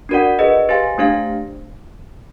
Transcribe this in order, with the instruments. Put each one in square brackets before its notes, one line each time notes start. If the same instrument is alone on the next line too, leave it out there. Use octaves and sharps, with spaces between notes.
[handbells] D4 F#4 A#4 D5 F#5
G#4 B4 D#5
G4 C5 F5 G#5
A3 D4 G4 C5 F5